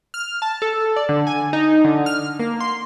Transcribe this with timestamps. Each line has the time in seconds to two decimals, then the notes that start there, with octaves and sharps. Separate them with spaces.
0.14 F6
0.42 A5
0.62 A4
0.96 D5
1.09 D3
1.27 G#5
1.53 D#4
1.85 D3
2.06 F6
2.40 A#3
2.60 C6